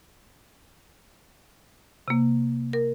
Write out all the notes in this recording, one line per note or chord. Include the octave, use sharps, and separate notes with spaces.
C3 A#3
A#4